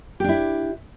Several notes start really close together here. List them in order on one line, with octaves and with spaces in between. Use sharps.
G4 D4 E4